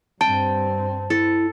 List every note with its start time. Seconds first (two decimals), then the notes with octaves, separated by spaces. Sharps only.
0.21 G2 C4 G5 A5
1.10 E4 A4